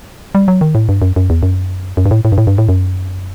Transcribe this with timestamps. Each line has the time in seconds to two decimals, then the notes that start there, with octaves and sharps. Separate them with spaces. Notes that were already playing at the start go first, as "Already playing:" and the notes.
0.35 G3
0.48 F#3
0.61 D#3
0.75 A2
0.89 G2
1.02 F#2
1.16 F#2
1.30 E2
1.43 F#2
1.97 F#2
2.06 G2
2.11 A2
2.25 A2
2.32 G2
2.38 A2
2.47 G2
2.58 A2
2.69 F#2